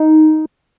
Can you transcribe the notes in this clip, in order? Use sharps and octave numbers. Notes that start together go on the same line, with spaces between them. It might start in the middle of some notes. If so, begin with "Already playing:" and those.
Already playing: D#4